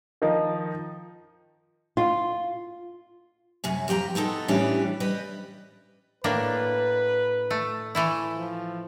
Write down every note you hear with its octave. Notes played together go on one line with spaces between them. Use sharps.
D#3 F3 D#4
F4
F#2 C3 C#4
F2 G4 G5 A#5
B3 C4 D#4 A4
A2 E3 G3 C#4 D4 G4
G3 B4 D#5
A2 A#3 D4 B4
A3
E3 A3 E4
F3